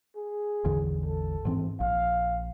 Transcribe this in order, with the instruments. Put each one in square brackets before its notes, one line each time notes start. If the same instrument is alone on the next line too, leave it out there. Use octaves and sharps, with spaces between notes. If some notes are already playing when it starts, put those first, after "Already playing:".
[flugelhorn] G#4
[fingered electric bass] A1 E2 D3
[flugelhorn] A4
[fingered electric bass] G#2 E3 C4
[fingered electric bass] A#1 [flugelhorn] F5